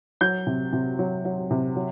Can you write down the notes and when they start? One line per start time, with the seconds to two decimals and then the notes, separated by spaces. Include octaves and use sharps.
0.21 F#3 G6
0.47 C3
0.73 C3
0.99 F#3
1.25 F#3
1.51 C3
1.76 F#3